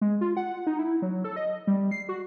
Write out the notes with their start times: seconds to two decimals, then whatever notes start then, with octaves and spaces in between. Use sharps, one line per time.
0.01 G#3
0.21 F4
0.37 F#5
0.67 D#4
0.79 E4
1.02 F#3
1.24 A4
1.36 D#5
1.67 G3
1.91 C7
2.09 F#4